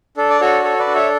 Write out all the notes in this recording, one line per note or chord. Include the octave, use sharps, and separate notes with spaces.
D4 A4
D5
F#4 A4 C#5
A4 C#5
B4 D5
D4
C#5 E5